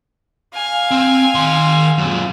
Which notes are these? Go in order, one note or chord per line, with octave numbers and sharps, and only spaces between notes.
F5 G#5
C4
D#3 C6
F#2 A#2